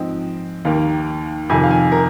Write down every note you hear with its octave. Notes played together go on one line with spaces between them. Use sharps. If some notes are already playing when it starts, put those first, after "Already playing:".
Already playing: G#2 F3 C4 D#5
D#2 D#3 A#3 F5
F2 C3 D#3 G#5
F5
G#5
A#4